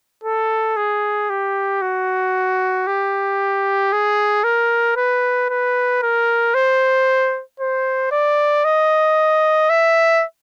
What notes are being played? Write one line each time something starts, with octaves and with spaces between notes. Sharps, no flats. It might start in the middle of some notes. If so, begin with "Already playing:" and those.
A4
G#4
G4
F#4
G4
G#4
A#4
B4
B4
A#4
C5
C5
D5
D#5
E5